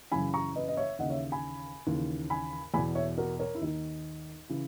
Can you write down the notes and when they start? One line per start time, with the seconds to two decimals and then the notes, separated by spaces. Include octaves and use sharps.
0.12 F#2 C#3 E3 G#5 B5
0.34 A#5 C#6
0.56 B4 D#5
0.68 D#5
0.77 C#5 E5
0.99 D#2 C#3 E3 D#5 F#5
1.10 C#5 E5
1.32 G#5 B5
1.87 D#2 C#3 E3
2.30 G#5 B5
2.74 E2 G#5 B5
2.78 B2
2.95 C#5 E5
3.18 F#4 A#4
3.39 A#4 C#5
3.55 E4
3.61 D#2 D#3 D#4
4.49 C#3 E3